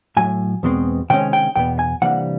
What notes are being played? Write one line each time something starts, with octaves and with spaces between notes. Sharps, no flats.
A2 F#3 A3 G#5
E2 B2 G#3 C4
C3 D#3 G#3 C#4 G5
G5
E2 B2 B3 G5
G#5
C3 E3 G3 A#3 D4 F#5